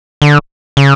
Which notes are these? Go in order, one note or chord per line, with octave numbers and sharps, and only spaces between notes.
D3
C#3